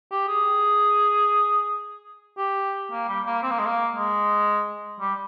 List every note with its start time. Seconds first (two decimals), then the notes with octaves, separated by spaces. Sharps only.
0.11 G4
0.28 G#4
2.38 G4
2.91 A#3
3.08 G3
3.26 A#3
3.43 C4
3.51 A#3
3.59 G#3
3.66 A#3
3.96 G#3
5.00 G3